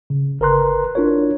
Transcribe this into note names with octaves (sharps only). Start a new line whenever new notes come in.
C#3
G1 A#4 B4 A#5 C6 F#6
D4 E4 F4 A#4 C#5